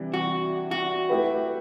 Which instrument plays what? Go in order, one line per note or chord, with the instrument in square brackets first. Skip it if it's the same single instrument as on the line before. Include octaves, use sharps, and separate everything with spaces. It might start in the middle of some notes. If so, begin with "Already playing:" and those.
Already playing: [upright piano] C3 E3 G3 D4
[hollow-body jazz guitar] F#4
F#4
[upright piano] A3 E4 G4 B4